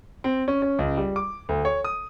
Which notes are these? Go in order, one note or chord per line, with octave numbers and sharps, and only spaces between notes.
C4
C#4
C#4
C#2
G3
D6
D2
C#5
D#6